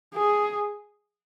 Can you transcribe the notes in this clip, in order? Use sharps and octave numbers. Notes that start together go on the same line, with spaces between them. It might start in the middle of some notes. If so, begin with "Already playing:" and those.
G#4